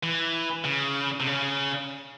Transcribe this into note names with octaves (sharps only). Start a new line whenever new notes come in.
E3
C#3
C3
C#3